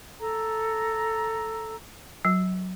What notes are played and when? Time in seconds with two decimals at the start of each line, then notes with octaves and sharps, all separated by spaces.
0.20 A4 A#5
2.25 F#3